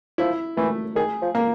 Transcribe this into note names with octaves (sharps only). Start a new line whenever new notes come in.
F3 E4
E3 A3
D#3 G#4
F3
A#3